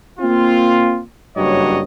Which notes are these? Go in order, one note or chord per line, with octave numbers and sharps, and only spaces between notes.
A#3 C4 F4
F#1 G2 F#3 C#5 D#5